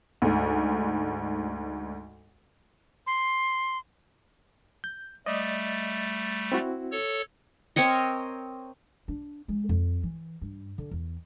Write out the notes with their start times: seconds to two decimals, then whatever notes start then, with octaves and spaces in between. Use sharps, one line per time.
0.22 D2 G#2
3.06 C6
4.84 G6
5.26 G3 A3 D5 D#5
6.52 C4 E4 F#4
6.91 A4 C#5
7.76 C4 A#4 C#5 D#5
9.08 D4
9.48 G#3
9.69 F2
10.03 E3
10.41 G2
10.78 D3
10.91 E2